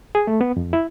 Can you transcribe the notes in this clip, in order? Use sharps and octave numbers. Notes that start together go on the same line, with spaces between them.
G#4
A3
B3
F2
E4